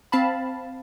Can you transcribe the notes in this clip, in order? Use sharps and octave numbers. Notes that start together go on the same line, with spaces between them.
C4 F5 A5 B5